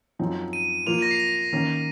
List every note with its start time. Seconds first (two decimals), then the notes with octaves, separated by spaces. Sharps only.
0.19 F#2 F3 C4 D#4
0.53 D#7
0.86 F3 A#3 F4 F7
0.94 D#7
1.02 A#6
1.11 C7
1.20 A#6
1.53 D#3 A#3 C#4